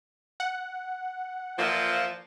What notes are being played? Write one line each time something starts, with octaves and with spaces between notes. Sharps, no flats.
F#5
A#2 E3 F3